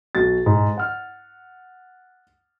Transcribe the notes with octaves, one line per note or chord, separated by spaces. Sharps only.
B1 F#4 A6
G#2
F#5 F6